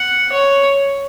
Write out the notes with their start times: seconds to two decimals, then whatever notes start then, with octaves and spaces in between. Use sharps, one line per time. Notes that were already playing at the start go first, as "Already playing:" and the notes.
Already playing: F#5
0.32 C#5